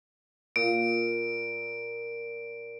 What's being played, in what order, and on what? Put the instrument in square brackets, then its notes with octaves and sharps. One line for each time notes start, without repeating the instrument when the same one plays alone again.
[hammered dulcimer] A#2 [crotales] D7